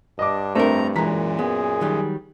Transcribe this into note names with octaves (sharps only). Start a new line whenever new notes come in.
G2 D4 D#5 D6
F2 A3 C4 D4 A4 A#4 A#5
F#2 A#2 E3 G#3 A#5 B6
B3 G#4
D#3 F#3 G3